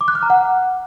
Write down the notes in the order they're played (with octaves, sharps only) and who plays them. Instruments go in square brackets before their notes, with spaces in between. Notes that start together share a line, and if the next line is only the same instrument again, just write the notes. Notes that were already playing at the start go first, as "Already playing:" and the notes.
[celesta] D6
F#6
F6
A#5
F#5